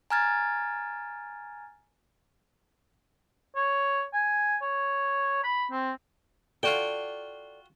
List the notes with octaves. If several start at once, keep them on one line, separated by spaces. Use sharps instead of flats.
G#5 A#5 F6 G#6 A6
C#5
G#5
C#5
B5
C4
F4 F#4 A4 D5 G5